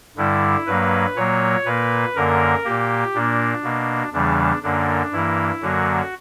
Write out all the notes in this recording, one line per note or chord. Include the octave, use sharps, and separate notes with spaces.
G2 D3 G3 E4
G2 F#3 A#3 B4
A#2 F#3 A#3 C#5
A#2 A#3 B4
F#2 D3 A#3 A#4
A#2 A#3 G4
A#2 A#3 D4
B2 A#3
E2 C#3 E3 G3 D4
F#2 D3 A#3 D4
G2 E3 A#3 E4
F#2 D3 F#3 A#3 F#4